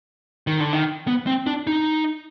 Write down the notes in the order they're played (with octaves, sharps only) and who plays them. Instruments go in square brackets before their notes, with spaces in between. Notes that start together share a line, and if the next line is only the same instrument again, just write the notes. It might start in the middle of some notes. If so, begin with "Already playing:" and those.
[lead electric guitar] D#3
D3
D#3
B3
C4
D4
D#4